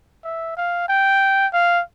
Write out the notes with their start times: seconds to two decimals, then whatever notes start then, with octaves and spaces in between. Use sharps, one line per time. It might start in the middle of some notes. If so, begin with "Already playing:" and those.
0.24 E5
0.57 F5
0.88 G5
1.53 F5